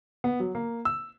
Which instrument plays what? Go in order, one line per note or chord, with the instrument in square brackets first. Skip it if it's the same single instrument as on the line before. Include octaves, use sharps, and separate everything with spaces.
[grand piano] B3
F#3
A#3
E6